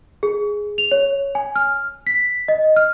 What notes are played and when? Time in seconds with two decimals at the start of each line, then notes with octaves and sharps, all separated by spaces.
0.23 G#4
0.78 F7
0.91 C#5
1.35 G#5
1.56 F6
2.07 B6
2.48 D#5
2.76 F6